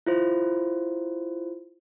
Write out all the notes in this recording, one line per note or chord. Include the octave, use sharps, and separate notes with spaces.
E4 F4 C5